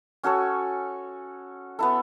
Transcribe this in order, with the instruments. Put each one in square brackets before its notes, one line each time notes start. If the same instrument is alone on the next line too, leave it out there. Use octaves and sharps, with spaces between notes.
[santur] C#4 F#4 A4 C#5
B3 E4 A4